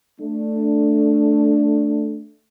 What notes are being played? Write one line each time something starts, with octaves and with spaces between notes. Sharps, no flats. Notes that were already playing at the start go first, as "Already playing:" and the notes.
A3 D4